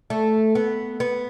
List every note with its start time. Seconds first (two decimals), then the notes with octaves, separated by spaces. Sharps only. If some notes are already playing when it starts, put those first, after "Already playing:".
0.10 A3
0.55 B3
1.00 B3